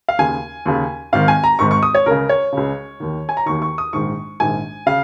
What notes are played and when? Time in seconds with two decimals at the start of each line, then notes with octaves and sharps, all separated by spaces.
0.08 F5
0.18 D#2 C#3 G#5
0.66 D#2 C#3
1.13 G#1 G#2 D#3 F5
1.28 G#5
1.44 A#5
1.59 G#1 G#2 D#3 C#6
1.71 C#6
1.83 D#6
1.95 C#5
2.06 C#2 C#3 A#4
2.29 C#5
2.52 C#2 C#3
3.00 D#2 D#3
3.29 G#5
3.37 A#5
3.46 D#2 D#3 C#6
3.62 C#6
3.78 D#6
3.93 A#1 G#2 D#3 C#6
4.40 A#1 G#2 D#3 G#5
4.86 C#3 F5